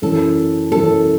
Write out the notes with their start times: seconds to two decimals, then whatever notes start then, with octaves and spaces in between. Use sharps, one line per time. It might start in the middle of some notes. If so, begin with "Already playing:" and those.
0.02 F#2 E3 A3 C#4 A4
0.71 F#2 E3 A3 C#4 A4